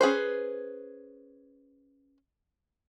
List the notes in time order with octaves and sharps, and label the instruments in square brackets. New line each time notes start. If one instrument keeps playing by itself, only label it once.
[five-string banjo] C#4 G#4 B4 C5